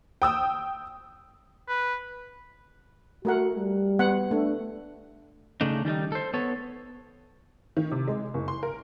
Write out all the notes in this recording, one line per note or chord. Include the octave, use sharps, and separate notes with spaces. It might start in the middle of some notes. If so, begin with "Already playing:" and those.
G5 D#6 E6
B4
A3 F#4 A#4 F#5
G3
B3 F#5
A3 D4
C#3 A3 D4 D#4
D#3 G3 C#4 D#4
A4 C5
B3 A4 C#5
D#3
C3
G#3
F#1
C6
A#4